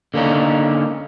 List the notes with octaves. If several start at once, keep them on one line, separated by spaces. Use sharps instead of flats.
D3 A#3 C#4 D#4